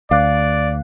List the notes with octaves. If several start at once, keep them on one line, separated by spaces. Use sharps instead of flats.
D2 D5 F5 F#6